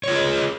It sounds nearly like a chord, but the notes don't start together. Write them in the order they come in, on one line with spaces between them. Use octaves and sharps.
C#5 F4 G#4